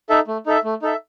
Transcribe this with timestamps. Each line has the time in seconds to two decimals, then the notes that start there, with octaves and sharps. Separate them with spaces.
0.09 D#4 A4 E5
0.27 A3
0.46 D#4 A4 E5
0.64 A3
0.82 D#4 A4 E5